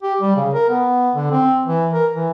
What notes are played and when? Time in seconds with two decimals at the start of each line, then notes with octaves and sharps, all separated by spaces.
0.03 G4
0.21 G3
0.36 C#3
0.54 A#4
0.70 B3
1.15 D3
1.32 C4
1.66 E3
1.94 A#4
2.14 E3